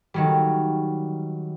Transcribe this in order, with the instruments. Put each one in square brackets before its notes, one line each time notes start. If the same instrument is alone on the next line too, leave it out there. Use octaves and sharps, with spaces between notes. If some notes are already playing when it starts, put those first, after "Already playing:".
[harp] D#3 F#3 G3